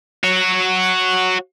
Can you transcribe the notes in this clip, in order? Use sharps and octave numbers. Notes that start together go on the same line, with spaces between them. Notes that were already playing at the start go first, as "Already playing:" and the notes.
F#4 C#5